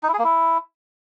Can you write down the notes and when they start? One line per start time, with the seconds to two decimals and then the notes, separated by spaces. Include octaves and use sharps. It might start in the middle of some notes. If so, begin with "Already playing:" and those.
0.03 D#4
0.08 E4
0.14 G#4
0.19 A#3
0.24 E4